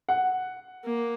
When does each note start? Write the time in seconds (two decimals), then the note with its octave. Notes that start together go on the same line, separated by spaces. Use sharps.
0.09 F#5
0.84 A#3